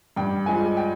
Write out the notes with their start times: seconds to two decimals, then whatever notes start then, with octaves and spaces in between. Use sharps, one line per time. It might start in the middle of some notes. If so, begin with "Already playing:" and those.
0.16 G2 G5
0.46 F3 G#3 G#5
0.77 G5